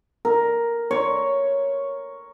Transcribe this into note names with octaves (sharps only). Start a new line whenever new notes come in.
A#4
C#5